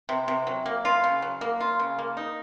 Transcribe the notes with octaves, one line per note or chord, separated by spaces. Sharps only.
C3
C3
F#3
A#3
F4
C#3
F#3
A#3
F4
C#3
A#3
D#4